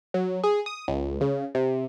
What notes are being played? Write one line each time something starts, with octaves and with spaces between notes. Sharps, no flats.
F#3
G#4
D#6
C#2
C#3
C3